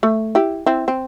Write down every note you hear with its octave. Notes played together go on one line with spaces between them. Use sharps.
A3
E4 G4
C4 E4
C4